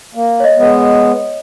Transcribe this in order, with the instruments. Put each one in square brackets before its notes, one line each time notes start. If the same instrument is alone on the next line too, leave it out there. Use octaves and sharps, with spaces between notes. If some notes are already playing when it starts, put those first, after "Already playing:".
[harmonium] A#3
[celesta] C#5 D#5
[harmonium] G#3 B3